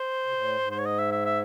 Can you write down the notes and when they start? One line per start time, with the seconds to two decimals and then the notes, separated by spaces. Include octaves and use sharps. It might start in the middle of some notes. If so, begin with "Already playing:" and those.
Already playing: C5
0.24 C3
0.33 A2
0.60 G#2
0.71 C5
0.78 C#5
0.86 D#5
0.99 E5
1.12 E5
1.26 E5